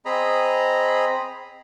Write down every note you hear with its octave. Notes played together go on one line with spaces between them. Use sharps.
C4 G#4 D#5 A#5 B5